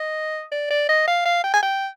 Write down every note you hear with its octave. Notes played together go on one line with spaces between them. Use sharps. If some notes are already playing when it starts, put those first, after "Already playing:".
Already playing: D#5
D5
D5
D#5
F5
F5
G5
G#5
G5